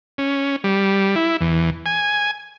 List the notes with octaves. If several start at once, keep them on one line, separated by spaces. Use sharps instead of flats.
C#4
G3
E4
E2
G#5